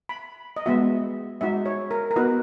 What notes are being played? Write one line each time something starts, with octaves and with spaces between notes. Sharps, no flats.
B5
D#5
G#3 B3 F#4 E5
G#3 D#4 F#4 E5
C#5
A#4
A#4
B3 D#4 F#4 B4